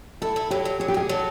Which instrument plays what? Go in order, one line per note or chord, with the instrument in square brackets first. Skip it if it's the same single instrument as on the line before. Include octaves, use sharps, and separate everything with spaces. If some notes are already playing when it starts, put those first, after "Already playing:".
[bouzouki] E4 [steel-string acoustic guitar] A4
[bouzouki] E4
[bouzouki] F#3 [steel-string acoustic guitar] G4
[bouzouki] F#3
[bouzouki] F#3 [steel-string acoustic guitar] G#4
[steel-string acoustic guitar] G4
[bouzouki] B2 [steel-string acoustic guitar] G#4
[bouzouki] F#3 [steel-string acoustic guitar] A4